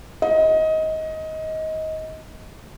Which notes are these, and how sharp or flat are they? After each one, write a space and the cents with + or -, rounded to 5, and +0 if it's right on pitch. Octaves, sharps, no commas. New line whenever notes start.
D#5 +20